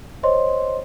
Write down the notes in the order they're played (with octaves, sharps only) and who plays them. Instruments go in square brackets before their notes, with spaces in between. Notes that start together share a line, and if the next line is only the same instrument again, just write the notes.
[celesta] C5 C#5 D#5 C6